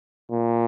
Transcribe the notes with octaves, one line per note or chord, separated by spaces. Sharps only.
A#2